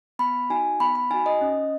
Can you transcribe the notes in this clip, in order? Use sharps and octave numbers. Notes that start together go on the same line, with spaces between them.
B3 B5
D#4 F#4 G#5
B3 B5
B5
D#4 F#4 G#5
D#5
C#4